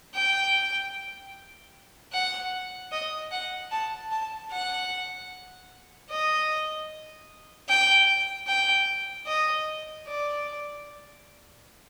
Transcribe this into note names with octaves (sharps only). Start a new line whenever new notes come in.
G5
F#5
D#5
F#5
A5
A5
F#5
D#5
G5
G5
D#5
D5